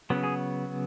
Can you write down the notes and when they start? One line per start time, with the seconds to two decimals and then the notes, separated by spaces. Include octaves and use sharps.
0.10 C#3 F#3 B3
0.23 G#4